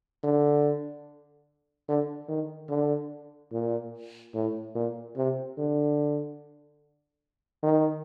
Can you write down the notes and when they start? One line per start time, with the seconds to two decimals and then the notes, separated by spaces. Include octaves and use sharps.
0.24 D3
1.88 D3
2.29 D#3
2.69 D3
3.52 A#2
4.34 A2
4.75 A#2
5.17 C3
5.58 D3
7.63 D#3